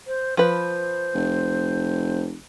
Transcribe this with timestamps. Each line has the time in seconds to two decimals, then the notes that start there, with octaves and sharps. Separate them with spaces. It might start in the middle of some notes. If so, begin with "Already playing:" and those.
0.07 C5
0.37 F3 B4 C5
1.15 F1